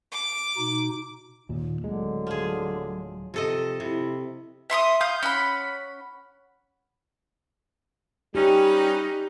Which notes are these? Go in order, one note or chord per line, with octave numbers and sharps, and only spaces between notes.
D6
B2 D#4
D#2 A#2
D1 D3 F#3 G#3
F3 G#4
C3 F3 A4 D#5
C3 E4
E5 C6 C#6 D#6
F5 C6 D#6 G6
C#4 F#5 B5
G3 C#4 D#4 G4 B4